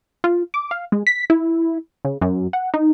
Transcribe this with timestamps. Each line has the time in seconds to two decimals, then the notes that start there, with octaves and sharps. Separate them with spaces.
0.24 F4
0.54 D6
0.71 F5
0.92 G#3
1.07 B6
1.30 E4
2.05 C#3
2.22 F#2
2.53 F#5
2.74 D#4